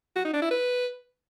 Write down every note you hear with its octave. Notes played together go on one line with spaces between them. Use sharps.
F#4
D#4
D4
E4
B4